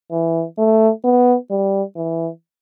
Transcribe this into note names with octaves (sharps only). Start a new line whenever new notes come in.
E3
A3
B3
G3
E3